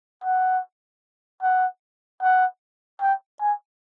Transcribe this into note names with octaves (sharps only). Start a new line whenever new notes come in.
F#5
F#5
F#5
G5
G#5